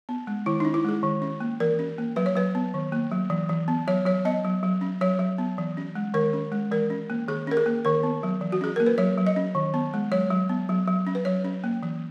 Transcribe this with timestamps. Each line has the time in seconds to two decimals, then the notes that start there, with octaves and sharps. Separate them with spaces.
0.09 B3
0.27 G#3
0.46 D#3 E4
0.60 C#4 D#4
0.74 E4
0.85 G#3 G#4
1.03 D#3
1.22 C#4
1.40 A#3
1.60 E3 A#4
1.79 C#4
1.98 A#3
2.16 F#3 B4
2.26 C#5
2.35 F#3 B4
2.55 B3
2.74 D#3
2.92 A#3
3.11 F#3
3.30 E3
3.49 E3
3.68 B3
3.88 F#3 C#5
4.05 F#3 C#5
4.25 B3 D#5
4.45 F#3
4.63 F#3
4.81 C#4
5.01 F#3 C#5
5.19 F#3
5.38 B3
5.58 E3
5.77 C#4
5.95 G#3
6.14 D#3 A#4
6.33 C#4
6.52 G#3
6.71 E3 A#4
6.90 C#4
7.10 A#3
7.28 D#3 G#4
7.47 C#4 A#4
7.57 G#4
7.66 A#3
7.85 D#3 A#4
8.03 B3
8.23 F#3
8.41 E3
8.52 F#4
8.61 C#4 G#4
8.76 A#3 A#4
8.86 B4
8.98 F#3 C#5
9.18 F#3
9.27 D#5
9.36 C#4
9.55 D#3
9.74 B3
9.94 G#3
10.12 F#3 C#5
10.30 F#3
10.49 B3
10.69 F#3
10.88 F#3
11.07 C#4
11.15 B4
11.25 F#3 C#5
11.44 C#4
11.64 A#3
11.83 E3